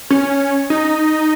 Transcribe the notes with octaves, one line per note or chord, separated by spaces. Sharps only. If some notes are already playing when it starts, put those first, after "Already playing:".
C#4
D#4